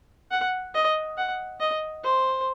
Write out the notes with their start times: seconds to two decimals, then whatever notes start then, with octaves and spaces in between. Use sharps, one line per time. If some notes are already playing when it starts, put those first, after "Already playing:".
0.31 F#5
0.75 D#5
1.17 F#5
1.60 D#5
2.04 C5